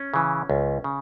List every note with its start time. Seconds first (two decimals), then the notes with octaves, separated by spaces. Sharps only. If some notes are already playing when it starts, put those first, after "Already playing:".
Already playing: C#4
0.14 C#3 E3
0.50 C#2
0.84 C#3